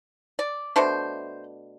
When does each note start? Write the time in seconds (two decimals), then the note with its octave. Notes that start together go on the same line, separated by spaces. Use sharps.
0.39 D5
0.76 B2 A3 D4 C5